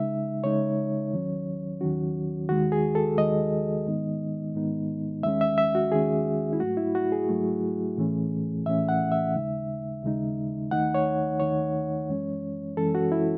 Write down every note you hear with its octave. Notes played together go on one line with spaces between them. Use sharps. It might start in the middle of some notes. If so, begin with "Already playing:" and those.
Already playing: C#3 G#3 D#4 E5
C#3 G#3 D#4 C#5
D#2 D#3 F#3 C#4
D#2 D#3 F#3 C#4 F#4
D#2 D#3 G#3 F#4
G#4
A4
D#2 D#3 G#3 D#5
G#2 D#3 G#3 B3 D#4
G#2 D#3 G#3 B3 D#4
D#2 D#3 G#3 C#4 E5
E5
E5
F#4
D#2 D#3 G#3 C#4 G#4
E4
G#2 F#3 A3 F#4
E4
F#4
G#4
G#2 F#3 A3
A2 E3 A3 C#4
A2 E3 A3 C#4 E5
F#5
E5
D#2 C#3 G#3 D#4
D#2 C#3 G#3 D#4
D#2 D#3 A3 D#4 F#5
C#5
D#2 D#3 A3 D#4 C#5
F#2 E3 G#3 C#4
F#2 E3 G#3 C#4 A4
F#4
E4